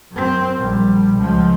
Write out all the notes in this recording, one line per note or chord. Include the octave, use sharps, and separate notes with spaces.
F#2 C4
A#1 G3
C#2 F3